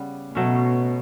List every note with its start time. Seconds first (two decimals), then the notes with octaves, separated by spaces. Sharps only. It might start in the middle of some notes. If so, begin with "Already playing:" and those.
Already playing: C#3 G3 B3
0.35 B2 F#3 A3 C#4